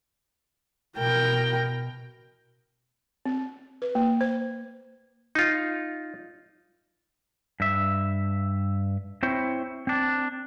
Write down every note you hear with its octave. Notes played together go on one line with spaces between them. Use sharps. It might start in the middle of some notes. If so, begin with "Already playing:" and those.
B2 A#4 G5
C4
B4
A#3
C5
D#4 F4
G2 E5
C4 E4 C5 C#5
C4 D4